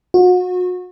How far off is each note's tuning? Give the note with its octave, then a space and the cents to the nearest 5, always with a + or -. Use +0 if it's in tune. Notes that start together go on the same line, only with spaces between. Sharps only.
F#4 -35